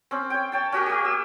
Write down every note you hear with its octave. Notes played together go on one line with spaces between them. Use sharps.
C4 C#4
C#5 G5
C#5 G5 A5
C#4 F#4 G4 A#4
A#3 G4
E6